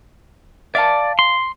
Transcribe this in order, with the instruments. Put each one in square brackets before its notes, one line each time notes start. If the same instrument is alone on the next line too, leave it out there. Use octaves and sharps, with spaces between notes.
[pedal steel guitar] D5 [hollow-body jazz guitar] E5 F5 A5
[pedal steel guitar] C6